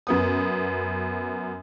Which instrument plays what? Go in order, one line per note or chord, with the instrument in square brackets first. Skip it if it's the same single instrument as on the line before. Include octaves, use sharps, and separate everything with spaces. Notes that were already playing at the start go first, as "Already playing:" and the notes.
[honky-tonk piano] F#2 B3 D#6